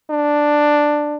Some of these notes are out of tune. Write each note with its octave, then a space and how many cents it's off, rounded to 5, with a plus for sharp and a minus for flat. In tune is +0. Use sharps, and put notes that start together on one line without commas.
D4 +5